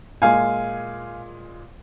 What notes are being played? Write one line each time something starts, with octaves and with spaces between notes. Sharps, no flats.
A#2 G#3 F5 G#5